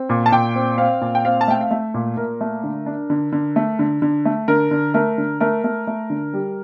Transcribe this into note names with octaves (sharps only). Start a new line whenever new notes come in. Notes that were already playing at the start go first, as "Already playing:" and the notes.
Already playing: C4
A#2
A5
A#2 G5
C4
C4 F5
A#2
G5
C4 F5
A5
A3 G5
F5
A3 E5
A#2
A#2 A#4
A3
D3
D4
D3
D3
A3
D3
D3
A3
D3 A#4
D3
A3 A#4
D3
A3 A#4
A3
A3
D3
G3